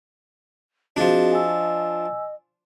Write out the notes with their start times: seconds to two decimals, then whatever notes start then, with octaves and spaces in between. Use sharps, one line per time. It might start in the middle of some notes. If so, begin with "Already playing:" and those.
0.97 F3 C4 D4 F#4 G#4 D#5
1.32 G#5 E6